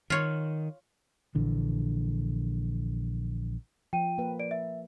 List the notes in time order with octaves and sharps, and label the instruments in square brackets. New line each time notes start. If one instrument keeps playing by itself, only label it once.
[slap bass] D#3 [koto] F4 C#5
[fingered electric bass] A#1 D3 E3
[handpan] F3 [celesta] G5 D#7
[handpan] A#3 B4
[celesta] D5 D7
E5